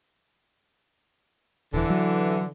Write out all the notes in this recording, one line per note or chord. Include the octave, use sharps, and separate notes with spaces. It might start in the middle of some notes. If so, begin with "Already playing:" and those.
D#1 D3 E3
F#3